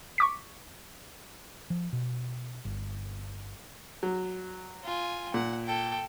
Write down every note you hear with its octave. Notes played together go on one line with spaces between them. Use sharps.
C#6 D6 B6
F3
B2
G1
F#3
F4 G#5
A#2 F#5
A4 G5